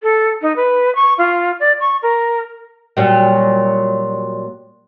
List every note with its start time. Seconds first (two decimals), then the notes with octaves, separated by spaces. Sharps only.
0.03 A4
0.42 D#4
0.56 B4
0.95 C#6
1.18 F4
1.60 D5
1.80 C#6
2.03 A#4
2.97 A#2 F#3 G3